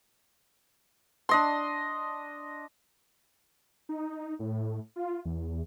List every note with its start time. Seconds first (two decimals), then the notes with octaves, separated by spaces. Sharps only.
1.29 D4 D#5 C6
3.89 D#4
4.39 A2
4.96 F4
5.25 E2